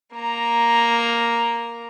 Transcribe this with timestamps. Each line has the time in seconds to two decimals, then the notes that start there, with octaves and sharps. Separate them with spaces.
0.15 A#3 A#5